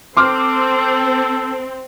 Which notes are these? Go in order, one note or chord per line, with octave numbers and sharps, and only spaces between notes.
C4 A4 C6 D6 F6